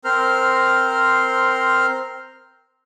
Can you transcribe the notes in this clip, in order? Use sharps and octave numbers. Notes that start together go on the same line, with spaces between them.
C4 A#4 C5 F6